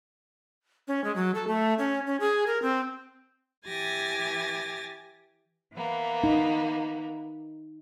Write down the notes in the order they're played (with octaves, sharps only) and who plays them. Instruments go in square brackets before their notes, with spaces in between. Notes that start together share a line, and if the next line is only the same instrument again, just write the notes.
[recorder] C#4
G#3
F#3
A4
A3
C#4
C#4
G#4
A#4
C4
[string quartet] E3 G4 G#5 A6 A#6
E3 A#3 B3
[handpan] D#4